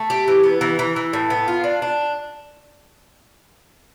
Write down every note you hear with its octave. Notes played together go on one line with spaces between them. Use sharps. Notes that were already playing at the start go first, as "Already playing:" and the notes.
Already playing: A3
G4
E3
B3
E3
E3
E3
A2
B3
F4
D4
D4